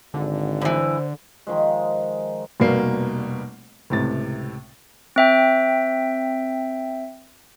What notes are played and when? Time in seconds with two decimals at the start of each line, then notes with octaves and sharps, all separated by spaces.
0.14 G#1 D3
0.61 G2 E3 C5
1.47 D#3 F3 G#3
2.60 F1 B2 G3 A#3 C7
3.90 C#2 A2 C3 A6
5.16 C4 E5 G5